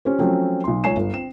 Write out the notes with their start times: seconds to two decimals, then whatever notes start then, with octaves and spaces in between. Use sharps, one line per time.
0.05 C#4 G4 C5
0.19 F3 F#3 A3 C4 C#4
0.64 B1 C6
0.84 C#2 C#5 G#5 C7 E7
0.96 G1
1.13 C4 E7